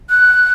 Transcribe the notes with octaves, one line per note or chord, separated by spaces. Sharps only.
F#6